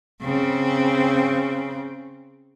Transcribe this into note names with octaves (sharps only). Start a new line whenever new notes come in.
C#3 C4